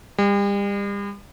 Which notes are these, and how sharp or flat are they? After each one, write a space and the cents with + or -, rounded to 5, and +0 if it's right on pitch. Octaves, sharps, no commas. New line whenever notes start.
G3 +40